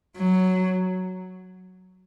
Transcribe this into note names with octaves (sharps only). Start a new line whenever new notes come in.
F#3